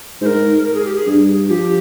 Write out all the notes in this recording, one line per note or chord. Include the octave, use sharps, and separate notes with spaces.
G#2 A#4 C5
A#4
G#4
G4
G#4
G2
F3 G4